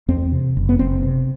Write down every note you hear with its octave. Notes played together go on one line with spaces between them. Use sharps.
E2 C4
C3
F#1
B3
F#1 C4
C3